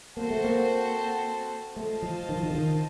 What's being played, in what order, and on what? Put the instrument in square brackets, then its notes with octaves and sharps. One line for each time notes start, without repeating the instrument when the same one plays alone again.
[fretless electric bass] A#3 [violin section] C4 F#4 A4 C5
[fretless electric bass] A3
A#3
[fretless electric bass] A3 [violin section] F4 C5 D#5 A5
[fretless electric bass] F3
D#3
F3
D#3
C#3
D#3